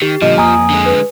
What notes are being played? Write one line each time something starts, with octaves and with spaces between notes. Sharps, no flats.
D#3 G4
A#2 D3 F3 G3 D#5
F2 A#3 D#5 G#5 A#5 D#6
D3 G#3
B4